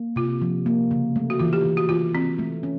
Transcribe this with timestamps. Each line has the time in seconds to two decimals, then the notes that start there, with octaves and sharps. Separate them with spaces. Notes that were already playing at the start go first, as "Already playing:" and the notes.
Already playing: A#3
0.16 C3 F4
0.41 F3
0.66 A#3
0.91 C#3
1.16 A3
1.30 F#4
1.39 E3 F4
1.53 G4
1.65 E3
1.77 F#4
1.89 E3 F4
2.14 E3 C4
2.39 A3
2.63 C#4